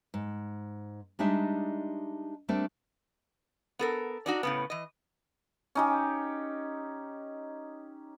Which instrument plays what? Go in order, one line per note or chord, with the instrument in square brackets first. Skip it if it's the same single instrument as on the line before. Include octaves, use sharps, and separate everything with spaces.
[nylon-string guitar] G#2
G3 G#3 D4 D#4 D#5 E5
G3 A3 C4 D4 A#4
[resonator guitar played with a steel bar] B3 A4 A#4
D4 D#4 F#4
A2 C#3 B3
E3 D#5
[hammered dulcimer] C#4 D#4 G4